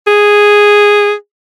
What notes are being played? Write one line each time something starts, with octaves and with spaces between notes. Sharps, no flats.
G#4